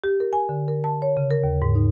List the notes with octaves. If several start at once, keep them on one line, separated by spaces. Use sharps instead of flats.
G4
A#4
G#5
D3
A#4
A5
C#5
C#3
A#4
D#2
G#2
D#4